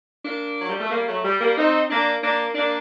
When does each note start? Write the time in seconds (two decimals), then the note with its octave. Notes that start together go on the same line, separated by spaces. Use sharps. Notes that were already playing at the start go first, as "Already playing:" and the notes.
0.25 A#3 D4
0.60 F#3
0.69 G3
0.80 A3
0.91 G3 A#3
1.07 F#3 A3
1.23 G3
1.40 G3 A#3
1.57 C4 D#4
1.90 A#3 D4
2.22 A#3 D4
2.55 A#3 D4